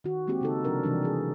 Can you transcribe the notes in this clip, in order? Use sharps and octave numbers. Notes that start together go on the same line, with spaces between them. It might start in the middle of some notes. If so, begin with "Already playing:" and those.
D#3 F#4
G#3 A#3 C4 F#4 G4
C#3 D#4 A4
C3 F3 D4 A#4
C3 E3 G3 D4
E3 G#4